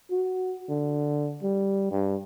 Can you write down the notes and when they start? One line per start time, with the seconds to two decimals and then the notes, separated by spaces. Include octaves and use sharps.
0.11 F#4
0.69 D3
1.43 G3
1.91 G2